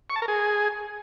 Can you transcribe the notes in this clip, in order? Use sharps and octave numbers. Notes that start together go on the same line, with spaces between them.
C#6
A5
A#4
G#4